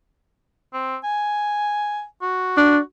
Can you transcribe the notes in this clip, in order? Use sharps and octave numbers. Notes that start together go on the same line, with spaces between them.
C4
G#5
F#4
D4